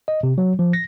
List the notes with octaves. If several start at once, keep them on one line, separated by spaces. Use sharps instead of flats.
D#5
C3
F#3
F3
A#6